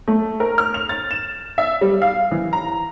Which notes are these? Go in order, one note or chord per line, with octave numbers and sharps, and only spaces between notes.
A3
A#4
F6
F7
A6
E7
E5
G3
F5
E3
A#5